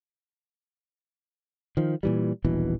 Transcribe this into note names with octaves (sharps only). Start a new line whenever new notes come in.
D#3 F3
A#2 E3 G3
D#1 A#1 B2 E3